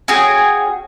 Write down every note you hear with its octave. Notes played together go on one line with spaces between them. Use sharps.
C#4 F#4 G#4 G5